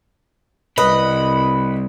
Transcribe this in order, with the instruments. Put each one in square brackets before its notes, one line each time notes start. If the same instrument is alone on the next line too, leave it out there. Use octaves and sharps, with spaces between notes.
[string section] C2 [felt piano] B4 [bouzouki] D#5 [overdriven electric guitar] B5